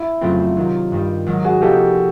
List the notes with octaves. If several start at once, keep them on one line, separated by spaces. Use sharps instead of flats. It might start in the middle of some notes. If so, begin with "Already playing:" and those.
Already playing: E4
F2 C#3 F#3 A3 C4 F4
C3 D#3 F#3 F4
G2 D#3 G3
G#2 D#3 F#3
F#4 G#4
C3 F3 A#3 D#4 G4 A4